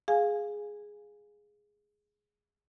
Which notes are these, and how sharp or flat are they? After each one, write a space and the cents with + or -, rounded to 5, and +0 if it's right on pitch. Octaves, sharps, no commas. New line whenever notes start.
G#4 +0 F5 +5 G#5 -5